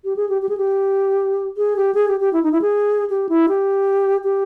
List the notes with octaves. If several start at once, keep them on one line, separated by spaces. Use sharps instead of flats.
G4
G#4
G4
G4
G#4
G4
G#4
G4
G#4
G4
G4
E4
D#4
E4
G#4
G4
E4
G4
G4